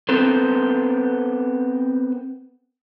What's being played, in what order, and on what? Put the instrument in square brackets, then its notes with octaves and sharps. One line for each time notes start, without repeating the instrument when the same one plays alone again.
[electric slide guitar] B3 C4 A4 A#4 C5